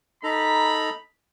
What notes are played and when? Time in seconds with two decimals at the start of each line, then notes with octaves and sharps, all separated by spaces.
0.23 D#4 A4 A#5 B5